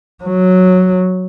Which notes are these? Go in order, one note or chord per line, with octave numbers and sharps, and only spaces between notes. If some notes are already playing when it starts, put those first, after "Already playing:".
F#3